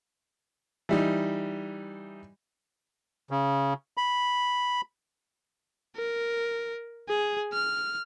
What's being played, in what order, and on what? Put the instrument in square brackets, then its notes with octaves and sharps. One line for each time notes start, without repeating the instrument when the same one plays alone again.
[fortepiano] E3 G3 D#4
[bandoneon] C#3
B5
[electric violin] A#4
G#4
F6